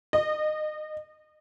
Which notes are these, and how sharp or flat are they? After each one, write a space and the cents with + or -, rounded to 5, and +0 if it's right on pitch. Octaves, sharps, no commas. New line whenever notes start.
D#5 -30